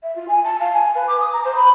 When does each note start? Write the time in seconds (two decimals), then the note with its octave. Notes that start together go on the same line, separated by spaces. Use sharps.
0.03 E5
0.16 F4
0.28 G#5
0.44 A5
0.60 F5
0.73 G#5
0.95 B4
1.08 D6
1.20 D#6
1.33 A#5
1.44 C5
1.56 B5